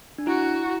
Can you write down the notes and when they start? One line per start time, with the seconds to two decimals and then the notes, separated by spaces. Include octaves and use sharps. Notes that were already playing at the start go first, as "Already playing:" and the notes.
0.18 D4
0.27 E4 F#4